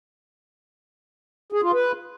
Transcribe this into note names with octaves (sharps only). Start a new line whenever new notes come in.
G#4
F4
B4